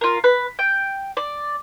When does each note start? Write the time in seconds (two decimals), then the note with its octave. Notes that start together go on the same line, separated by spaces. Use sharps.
0.01 F4 A#4
0.24 B4
0.59 G5
1.17 D5